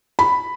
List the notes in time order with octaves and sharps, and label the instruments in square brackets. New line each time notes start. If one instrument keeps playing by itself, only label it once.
[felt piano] B5